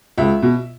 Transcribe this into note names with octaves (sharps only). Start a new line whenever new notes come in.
C#2 E5
B2